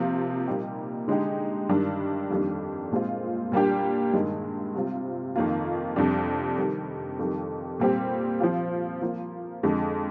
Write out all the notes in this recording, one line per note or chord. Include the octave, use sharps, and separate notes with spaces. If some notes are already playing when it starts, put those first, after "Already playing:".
Already playing: C3 F3 A#3 F4
A#2 G3 A#3 D#4 G4
D3 G#3 D#4 G4
G2 D#3 G3 D4
F2 D#3 G3 A#3 D4
A#2 G#3 C4 F4
A#2 G3 A#3 D4 G4
G2 D#3 G#3
C3 G3 C4 F4
F2 D#3 A#3 F4
F2 C3 G3 D4
C3 D#3 G3
F2 D#3 G3
A#2 G3 C4 G4
F3 C4 F4
F3 A#3 F4
F2 D3 G#3